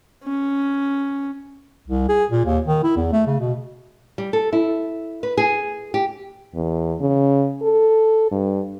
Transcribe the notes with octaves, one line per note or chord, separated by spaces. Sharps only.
C#4
C2
G#4
A#2
D#2
D#3
E4
E2
A3
C#3
B2
G3
A4
E4
B4
G#4
G4
E2
C#3
A4
G2